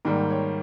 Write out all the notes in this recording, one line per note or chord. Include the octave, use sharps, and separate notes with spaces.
G#2 D#3 G3 A#3 A#4
C#5